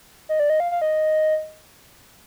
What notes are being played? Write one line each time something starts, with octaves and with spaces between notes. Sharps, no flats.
D#5
D5
D#5
F5
F5
D#5